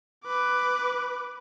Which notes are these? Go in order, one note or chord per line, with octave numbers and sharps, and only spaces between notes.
B4 D6